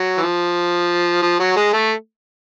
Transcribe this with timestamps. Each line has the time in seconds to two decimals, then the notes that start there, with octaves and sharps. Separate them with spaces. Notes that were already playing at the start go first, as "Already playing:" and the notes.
Already playing: F#3
0.17 E3
0.22 F3
1.22 F3
1.39 F#3
1.56 G#3
1.73 A3